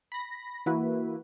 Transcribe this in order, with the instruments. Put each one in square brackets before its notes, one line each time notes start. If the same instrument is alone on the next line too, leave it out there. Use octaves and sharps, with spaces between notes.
[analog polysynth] B5 A#6
E3 A#3 E4 F#4 B4